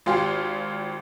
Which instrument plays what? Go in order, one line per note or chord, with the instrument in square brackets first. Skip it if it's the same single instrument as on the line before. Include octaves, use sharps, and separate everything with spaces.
[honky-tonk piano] G#1 F4 G4 C6